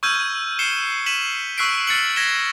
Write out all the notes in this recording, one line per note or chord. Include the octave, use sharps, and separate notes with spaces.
C#6 E6 F6 G6 G#6 D#7
C7 C#7 E7 G7
B6 D#7 E7 F#7
C#6 E6 F#6 B6 C7 D7
F6 A6 C#7 F#7
G#6 A#6 B6 C#7 E7 G7